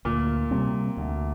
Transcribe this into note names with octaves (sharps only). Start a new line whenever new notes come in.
D2 A#2
C3 G3 C4
D2